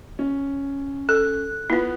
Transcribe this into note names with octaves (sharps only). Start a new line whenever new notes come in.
C#4
A4 F#6
B3 E4 F4